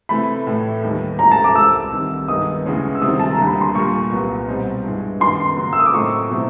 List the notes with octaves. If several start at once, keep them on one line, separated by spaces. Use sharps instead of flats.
C3 E3 A3 B5
A2 E3 A3
D#2 D#3 G3 B3
G#2 E3 A3 C#4 A#5
A5
D6
C2 C3 E3 G3 C4 E6
C2 C3 D#3
G2 D#3 G#3 B3 D#4 D#6
D2 C#3 E3 G#3 C#4
E6
C3 D#3 G3 C4 E4 D#6
A5
A#5
D#2 D3 G3
B5
C6
A#2 G3 A#3 C#6
C2 A#2 F#3 B3
B2 G3 C4 D#4
G2 E3 G#3
F#2 D#3 F#3 B3 C6
C#3 F#3 A#3
E6
D#6
D6
A2 F#3 A3 C4 D#4 C#6
B2 F#3 A3 C4 E4